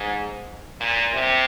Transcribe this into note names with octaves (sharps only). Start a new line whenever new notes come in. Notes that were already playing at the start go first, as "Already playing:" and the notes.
Already playing: G#2
A#2
C3